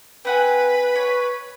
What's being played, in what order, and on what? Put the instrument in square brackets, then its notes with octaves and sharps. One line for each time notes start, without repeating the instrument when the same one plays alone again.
[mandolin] C4 F#5 G#5 [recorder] B4
[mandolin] C#5